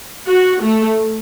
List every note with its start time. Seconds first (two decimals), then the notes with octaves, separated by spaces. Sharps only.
0.28 F#4
0.63 A3